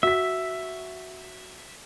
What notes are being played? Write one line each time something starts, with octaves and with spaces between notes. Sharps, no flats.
F#4 E5 B6